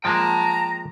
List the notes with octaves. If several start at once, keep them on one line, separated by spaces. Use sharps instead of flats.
F3 G#3 A#3 G5 A5 A#5